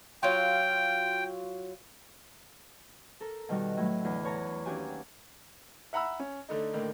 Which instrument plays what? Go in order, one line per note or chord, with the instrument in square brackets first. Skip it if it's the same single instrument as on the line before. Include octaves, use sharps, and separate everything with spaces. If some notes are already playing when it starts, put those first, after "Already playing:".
[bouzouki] F#3 F4 [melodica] G5
[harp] A4 A#4
B2 D#3 G3 F#4
A2 F#3
E2 D3
B4 C#5 A5 A#5
D#2 C#4 D4 F#4 G4 G#5
[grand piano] E5 F#5 A#5 B5 E6
C#4
D3 A3 D#4
A2 D3 D#3 A#3